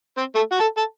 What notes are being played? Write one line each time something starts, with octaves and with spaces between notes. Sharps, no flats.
C4 C5
A3 A4
F#4 F#5
A4 A5
A4 A5